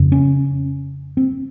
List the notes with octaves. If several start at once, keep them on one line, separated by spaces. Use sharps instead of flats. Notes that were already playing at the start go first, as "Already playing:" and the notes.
Already playing: F2 C#3
C#4
C4